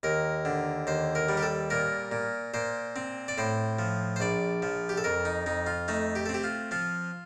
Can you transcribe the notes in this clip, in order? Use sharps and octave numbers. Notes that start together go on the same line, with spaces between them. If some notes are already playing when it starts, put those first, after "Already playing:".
D#2 A#4
D3
D#2 C5
A#4
G3
G4
A4
A#2 A#4
A#2
A#2 C5
C4
D5
A2 C5
F3
C5
A#1 D5
F3
G4
A4
F2 A#4
D#4
F2 D#4
F4
A3 D#4
G4
C4 A4
G4
F4
F3 F4